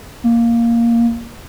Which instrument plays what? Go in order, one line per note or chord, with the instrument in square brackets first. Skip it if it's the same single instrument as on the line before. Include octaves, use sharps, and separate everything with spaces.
[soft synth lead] A#3